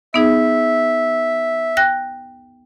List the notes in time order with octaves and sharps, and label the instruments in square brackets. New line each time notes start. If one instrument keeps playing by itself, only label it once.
[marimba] B3 D#4 G#4 [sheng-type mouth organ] E5
[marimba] G5 F#6 A#6